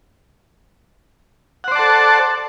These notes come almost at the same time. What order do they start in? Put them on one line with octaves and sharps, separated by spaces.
F#5 C5 D5 A5 A4